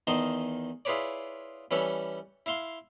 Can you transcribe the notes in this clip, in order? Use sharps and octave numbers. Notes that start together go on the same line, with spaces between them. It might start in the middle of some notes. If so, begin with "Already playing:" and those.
E2 D#3 D#4 D#5 A5 C6
E4 F4 G#4 B4 C#5 D5
E3 G3 C#4 A4 B4 C#5
E4 E5 F5 C6